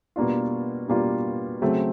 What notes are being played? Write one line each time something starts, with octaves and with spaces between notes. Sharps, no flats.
B2 G3 A#3 D4 F4
B2 G3 A#3 D4 F4
C#3 F#3 A3 C4